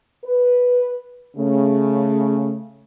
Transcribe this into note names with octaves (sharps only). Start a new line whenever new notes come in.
B4
C#3 A3